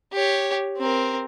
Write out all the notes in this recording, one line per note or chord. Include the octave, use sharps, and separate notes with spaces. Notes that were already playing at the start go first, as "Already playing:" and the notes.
G4 C#5
C4 A#4